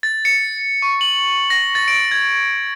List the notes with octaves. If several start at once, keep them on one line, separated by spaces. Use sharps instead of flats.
A6
C#7
C#6
F#7
A#6
A6
D7
G#6